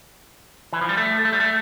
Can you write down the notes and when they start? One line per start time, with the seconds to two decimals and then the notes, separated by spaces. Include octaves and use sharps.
0.73 E3
0.81 F3
0.89 G3
0.97 A3
1.25 A3
1.33 G3
1.40 A3